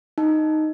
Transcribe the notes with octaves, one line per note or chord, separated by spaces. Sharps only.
D#4